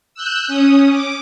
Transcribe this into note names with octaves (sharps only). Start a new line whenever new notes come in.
E6 F#6 G6
C#4 D#6
D6